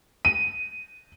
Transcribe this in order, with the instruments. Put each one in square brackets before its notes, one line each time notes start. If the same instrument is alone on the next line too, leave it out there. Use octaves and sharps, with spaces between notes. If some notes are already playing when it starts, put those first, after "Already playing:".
[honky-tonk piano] D#7